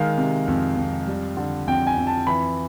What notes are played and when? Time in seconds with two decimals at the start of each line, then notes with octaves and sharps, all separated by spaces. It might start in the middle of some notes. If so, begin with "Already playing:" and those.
Already playing: D#3 G#3 F5
0.18 C3
0.48 F2
0.77 F2
1.07 G3
1.37 D3
1.67 F2 G5
1.87 G#5
1.97 F2
2.07 A5
2.27 E3 B5